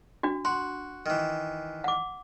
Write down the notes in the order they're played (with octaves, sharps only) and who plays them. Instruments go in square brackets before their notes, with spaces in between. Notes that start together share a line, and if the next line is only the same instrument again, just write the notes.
[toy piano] D4 F#4
[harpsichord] F#4 [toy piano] C6
[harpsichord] D#3 E3
[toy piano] F#5 D6